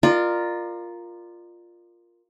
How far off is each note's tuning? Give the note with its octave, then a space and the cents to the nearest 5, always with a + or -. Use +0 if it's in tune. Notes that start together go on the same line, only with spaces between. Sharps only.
F4 +0 A#4 +0 D5 +40